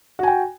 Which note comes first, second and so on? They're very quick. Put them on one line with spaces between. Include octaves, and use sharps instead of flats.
F#4 G#5 G5